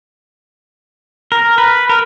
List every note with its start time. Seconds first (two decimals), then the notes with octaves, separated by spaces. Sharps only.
1.32 A#4
1.58 B4
1.89 A#4